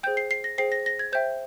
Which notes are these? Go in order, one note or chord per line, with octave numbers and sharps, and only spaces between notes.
G#4 C5 G5 G6
C7
C7
A#6
G#4 C5 G5 C7
A#6
A#6
G#6
C5 E5 G5 G6